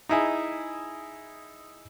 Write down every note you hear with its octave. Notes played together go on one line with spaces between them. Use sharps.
D#4 E4 G#4